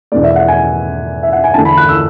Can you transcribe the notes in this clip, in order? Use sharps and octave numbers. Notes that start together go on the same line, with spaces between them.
E2 B2 A3 D5
E5
F#5
G#5
E5
F#5
G#5
E2 D3 A3 A5
B5
F#6
E6